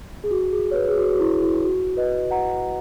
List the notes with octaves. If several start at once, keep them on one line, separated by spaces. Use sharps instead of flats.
G#4
F#4
G#4
C#5
B4
G#4
F#4
F#4
E4
E4
E4
F#4
B4 D#5
F#5 A#5